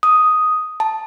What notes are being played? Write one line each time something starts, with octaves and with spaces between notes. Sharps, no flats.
D#6
A5